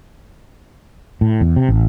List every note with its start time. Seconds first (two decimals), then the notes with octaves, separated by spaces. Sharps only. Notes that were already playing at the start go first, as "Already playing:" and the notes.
1.21 A2
1.41 E2
1.56 C3
1.69 A1